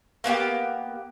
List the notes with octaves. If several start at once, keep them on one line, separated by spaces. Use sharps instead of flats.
A#3 B3 F#4 G4